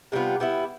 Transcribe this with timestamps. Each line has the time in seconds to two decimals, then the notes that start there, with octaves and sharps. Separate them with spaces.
0.12 C3 G3 B3 F4
0.40 G3 B3 E4